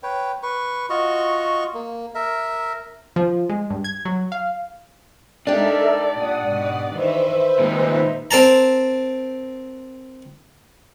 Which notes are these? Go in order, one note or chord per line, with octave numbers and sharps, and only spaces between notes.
B4 C#5 G5
B4 C#6
F4 F#4 D#5 C#6
A#3
A#4 E5
F3
G#3
G2
G#6
F#3
F5
G#3 D4 D#4 G4 A4 A#4 D5 E5
A#2 F#5 D#6
G#2 B2
D#3 E3 B4 C5 E5
A#2 D#3 G#3 D#4
C4 A#4 A5 A#5